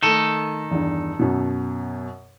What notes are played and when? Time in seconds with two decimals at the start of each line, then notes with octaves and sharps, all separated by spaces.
0.03 D#3 A3 A4 D#7 E7
0.71 E2 G2
1.19 F#2 B2